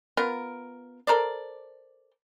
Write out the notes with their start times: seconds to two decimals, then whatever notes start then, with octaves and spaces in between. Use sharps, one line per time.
0.17 B3 F4 A#4
1.07 A4 A#4 C5 D5